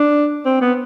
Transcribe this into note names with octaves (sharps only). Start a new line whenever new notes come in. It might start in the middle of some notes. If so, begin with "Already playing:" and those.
Already playing: D4
C4
B3